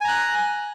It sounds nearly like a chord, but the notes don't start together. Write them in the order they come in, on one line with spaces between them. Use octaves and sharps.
G#5 A#5 F#6